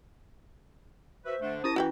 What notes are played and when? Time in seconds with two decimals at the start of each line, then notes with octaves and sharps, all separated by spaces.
1.25 F#4 B4 C5 E5
1.41 D3 A3 D4
1.64 C#4 E4 A5 D#6 A#6
1.76 E3 F#4 B4 G5